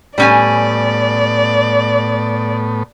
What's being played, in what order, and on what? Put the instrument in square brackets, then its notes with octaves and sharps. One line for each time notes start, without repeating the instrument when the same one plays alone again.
[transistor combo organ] A2 B3 [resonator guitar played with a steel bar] G3 C#4 G#5 [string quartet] D5